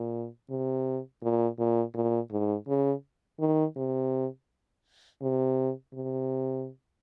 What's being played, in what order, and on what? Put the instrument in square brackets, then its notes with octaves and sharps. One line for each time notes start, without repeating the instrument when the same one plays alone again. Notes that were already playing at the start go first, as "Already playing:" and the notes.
Already playing: [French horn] A#2
C3
A#2
A#2
A#2
G#2
C#3
D#3
C3
C3
C3